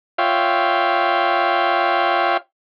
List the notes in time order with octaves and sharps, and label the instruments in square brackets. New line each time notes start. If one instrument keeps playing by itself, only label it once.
[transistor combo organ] F4 C#5 E5 F5 G5